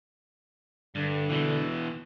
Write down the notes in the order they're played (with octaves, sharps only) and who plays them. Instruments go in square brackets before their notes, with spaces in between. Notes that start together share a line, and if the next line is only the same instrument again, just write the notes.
[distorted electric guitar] G2 [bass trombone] D3
[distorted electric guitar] B2 E3